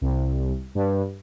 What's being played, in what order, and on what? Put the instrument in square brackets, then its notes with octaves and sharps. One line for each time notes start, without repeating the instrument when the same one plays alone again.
[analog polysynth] C2
G2